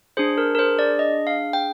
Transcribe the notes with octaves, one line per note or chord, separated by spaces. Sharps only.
D4 G#4 C5
A#4
A#4
C5
D5
D#5
F5
G5